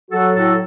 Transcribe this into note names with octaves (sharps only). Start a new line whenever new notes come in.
F#3 F#4 A4
A2 F#4 A4